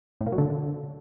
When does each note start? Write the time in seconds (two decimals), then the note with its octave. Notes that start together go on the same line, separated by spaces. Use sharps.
0.21 A2
0.26 A#2
0.32 F#3
0.38 D3